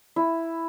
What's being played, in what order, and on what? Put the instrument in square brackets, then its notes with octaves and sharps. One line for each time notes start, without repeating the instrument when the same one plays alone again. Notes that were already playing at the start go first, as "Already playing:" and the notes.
[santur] E4